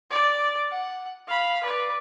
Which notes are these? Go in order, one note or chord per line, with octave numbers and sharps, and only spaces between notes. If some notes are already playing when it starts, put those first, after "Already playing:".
D5
F#5
F5 B5
B4 D5